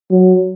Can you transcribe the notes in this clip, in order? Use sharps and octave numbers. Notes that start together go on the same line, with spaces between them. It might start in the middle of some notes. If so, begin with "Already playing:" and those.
F#3